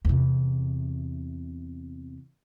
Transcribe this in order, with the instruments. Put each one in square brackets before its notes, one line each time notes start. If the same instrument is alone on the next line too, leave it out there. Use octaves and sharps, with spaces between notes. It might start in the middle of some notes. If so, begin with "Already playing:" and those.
[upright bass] E2 C3